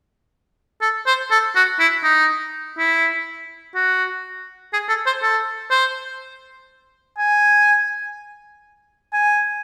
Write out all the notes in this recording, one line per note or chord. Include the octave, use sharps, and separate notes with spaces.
A4
C5
A4
F#4
E4
D#4
E4
F#4
G#4
A4
C5
A4
C5
G#5
G#5